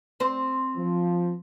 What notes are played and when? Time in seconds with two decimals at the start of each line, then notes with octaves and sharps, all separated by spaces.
0.20 C4 C5
0.77 F3